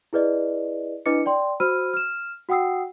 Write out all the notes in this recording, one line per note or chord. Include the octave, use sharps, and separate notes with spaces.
E4 G#4 B4 D5 D#5
D4 E4 B4 D#5 D6 C#7
D5 G5 C6
F#4 C5 B5 E6 F6 D#7
F6 E7
F#4 F#5 G5 D#6 E6 C7